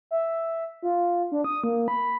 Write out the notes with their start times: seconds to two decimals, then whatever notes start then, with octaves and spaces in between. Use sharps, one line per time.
0.11 E5
0.83 F4
1.32 D4
1.44 D#6
1.64 A#3
1.88 B5